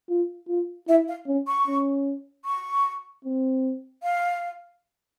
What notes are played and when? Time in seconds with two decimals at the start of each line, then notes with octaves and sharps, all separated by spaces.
0.09 F4
0.49 F4
0.88 E4 E5
1.08 F5
1.27 C#4
1.47 C#6
1.68 C#4
2.45 C#6
3.25 C4
4.03 F5